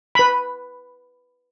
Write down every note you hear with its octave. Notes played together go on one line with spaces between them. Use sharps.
B4 B5